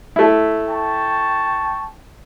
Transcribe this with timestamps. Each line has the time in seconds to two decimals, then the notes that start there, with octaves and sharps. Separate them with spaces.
0.16 A3 E4
0.69 G5 A5 C#6